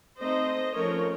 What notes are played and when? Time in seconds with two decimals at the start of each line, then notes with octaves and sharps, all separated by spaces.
0.19 A3 C4 D#4 C5 D#5
0.76 F3 A3 C#4 A#4 C#5